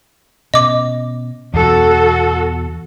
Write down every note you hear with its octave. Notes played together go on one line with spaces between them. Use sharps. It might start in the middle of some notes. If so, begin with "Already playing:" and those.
B2 C#4 D#5 D6
E2 B2 F#4 A4